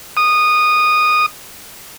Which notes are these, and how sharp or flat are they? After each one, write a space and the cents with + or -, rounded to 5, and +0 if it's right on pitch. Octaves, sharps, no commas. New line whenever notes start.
D#6 -15